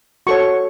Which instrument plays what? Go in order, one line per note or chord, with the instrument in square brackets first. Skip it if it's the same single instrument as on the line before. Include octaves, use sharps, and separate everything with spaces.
[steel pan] F#4 A4 C#5 C#6